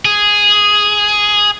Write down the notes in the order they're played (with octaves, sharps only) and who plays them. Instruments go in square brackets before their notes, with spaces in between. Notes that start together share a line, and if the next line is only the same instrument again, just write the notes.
[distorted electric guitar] G#4